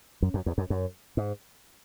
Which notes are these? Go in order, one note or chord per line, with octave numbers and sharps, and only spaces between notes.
F#2
F#2
E2
F#2
F#2
G#2